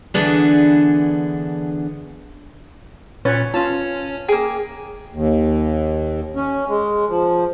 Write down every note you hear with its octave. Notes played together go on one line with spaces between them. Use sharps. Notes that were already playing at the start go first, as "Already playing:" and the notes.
D3 E3 B3 D4 G#4
A#2 C#4 B4 C#5 A6
C#4 F4 C#5 A5
A#3 G#4 G5
D#2
C#4
G#3
F3